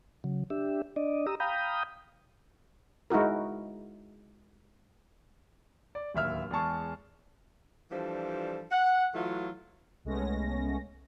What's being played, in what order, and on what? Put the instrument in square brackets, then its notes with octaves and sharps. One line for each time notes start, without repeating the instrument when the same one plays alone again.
[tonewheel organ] C#3 F#3
D4 G4 E5
D4 D5 D#5
G4 A#5 D#6 E6
F5 G5 A#5 B5 D#6 G6
[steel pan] G#3 D#4 E4 F#4 A#4
[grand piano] D5
D1 D#2 E5 F6
E2 G#3 G#4 A5 C#6
[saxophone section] E3 F3 G3 D4 F4 A4
F#5
E3 F#3 A3 E4 F4
[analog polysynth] C2 G#3 A3 B3 C#4 A#6